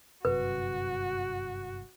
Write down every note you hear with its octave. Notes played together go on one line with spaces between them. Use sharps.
G1 F#2 C3 F#4 B4